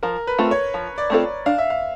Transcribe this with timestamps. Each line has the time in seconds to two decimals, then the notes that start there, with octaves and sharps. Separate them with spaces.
0.03 F3 A#4
0.27 B4
0.38 A3 C4 F4 A4
0.51 C#5
0.74 F3
0.98 D5
1.10 A3 C4 F4 A4
1.46 D4 F5
1.58 E5
1.70 F5